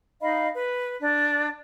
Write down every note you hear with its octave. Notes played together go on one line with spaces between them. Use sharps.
D#4 D#5 F5 B5
B4
D4